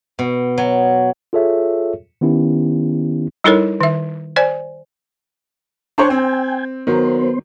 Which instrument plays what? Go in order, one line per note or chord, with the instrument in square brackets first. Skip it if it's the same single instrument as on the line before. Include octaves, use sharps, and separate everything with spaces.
[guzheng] B2
F#3
[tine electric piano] F4 G#4 A4 C#5 E5
D#3 B3 C#4 E4 G4
[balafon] G3 D#4 E4 A4 A#4 C#5
D#3 E5
C5 D5 G#5
[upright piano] D4 C5 C#5 [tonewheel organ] G5 G#5
[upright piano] C4
[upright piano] D#3 F#3 [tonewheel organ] B3 C5